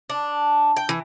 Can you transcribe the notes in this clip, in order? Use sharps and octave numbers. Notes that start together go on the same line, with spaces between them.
D4
G5
E3